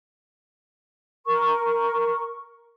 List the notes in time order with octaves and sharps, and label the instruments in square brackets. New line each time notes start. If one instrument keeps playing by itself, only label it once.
[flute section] A#4 C#6